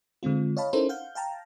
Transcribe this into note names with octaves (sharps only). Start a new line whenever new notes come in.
D3 G#3 C4 F4
C#5 D#5 F5 A5 B5
C#4 D#4 E4 A4 A#4 C5
F5 F#5 G6
F5 G5 A5 A#5